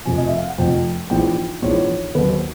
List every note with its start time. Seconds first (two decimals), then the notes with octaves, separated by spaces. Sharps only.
0.05 F1 F2 C3 F3 G#5
0.18 D#5
0.28 E5
0.38 F5
0.48 F#5
0.58 F1 F2 C3 F3 G5
1.10 A#1 G#2 E3 G5
1.62 A#1 G#2 E3 C#5
2.15 D#2 D#3 F#3 B4
2.28 C5